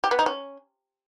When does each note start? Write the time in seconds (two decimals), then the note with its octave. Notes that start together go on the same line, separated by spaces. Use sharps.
0.04 G4
0.11 B3
0.19 D#4
0.26 C#4